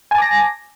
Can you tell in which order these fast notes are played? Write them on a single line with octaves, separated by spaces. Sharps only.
G#5 A5 D6 A#6